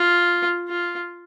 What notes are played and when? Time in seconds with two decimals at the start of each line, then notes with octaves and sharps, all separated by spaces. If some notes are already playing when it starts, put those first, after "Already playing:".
Already playing: F4
0.69 F4